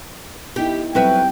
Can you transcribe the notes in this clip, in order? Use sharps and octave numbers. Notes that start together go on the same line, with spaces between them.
B3 D#4 E4 G4
F#3 G3 C4 B4 E5 G5